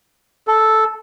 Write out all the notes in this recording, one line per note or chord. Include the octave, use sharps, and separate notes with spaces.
A4